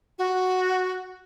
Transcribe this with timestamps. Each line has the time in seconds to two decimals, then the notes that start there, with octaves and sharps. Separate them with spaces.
0.19 F#4